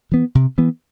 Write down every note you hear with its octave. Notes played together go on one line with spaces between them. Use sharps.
E3 B3
C3
E3 B3